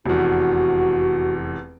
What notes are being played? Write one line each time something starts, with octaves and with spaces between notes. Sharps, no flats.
F1 E2 F#4